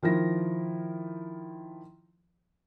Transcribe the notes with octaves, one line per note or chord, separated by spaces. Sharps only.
D#3 F3 E4 A#6